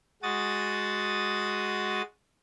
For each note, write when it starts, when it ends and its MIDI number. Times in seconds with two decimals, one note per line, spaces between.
0.23 2.02 56
0.23 2.02 66
0.23 2.02 87
0.23 2.02 93